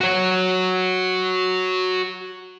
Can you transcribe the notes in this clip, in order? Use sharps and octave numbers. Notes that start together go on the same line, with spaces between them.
F#4 C#5